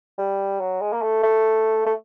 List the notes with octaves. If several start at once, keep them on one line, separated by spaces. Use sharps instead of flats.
G3
F#3
G#3
A#3
A3
A3
A3